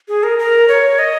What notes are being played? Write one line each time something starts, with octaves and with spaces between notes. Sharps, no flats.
G#4
A#4
A#4
C#5
D#5